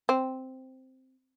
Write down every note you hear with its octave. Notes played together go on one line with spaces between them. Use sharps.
C4